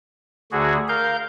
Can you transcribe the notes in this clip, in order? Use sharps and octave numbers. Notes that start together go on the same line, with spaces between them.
D2 D3 F#4 G#4
A#4 F5 G6